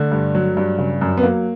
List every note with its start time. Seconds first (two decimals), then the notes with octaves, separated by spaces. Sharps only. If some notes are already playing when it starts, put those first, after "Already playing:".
Already playing: D3 A3
0.12 G2
0.35 F#3
0.57 G2
0.78 C#3
1.01 F#2
1.18 B3
1.23 F#3 A#3